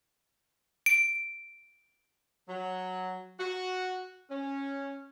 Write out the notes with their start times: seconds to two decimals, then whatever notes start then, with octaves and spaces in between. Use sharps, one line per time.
0.86 D7
2.48 F#3
3.40 F#4
4.30 C#4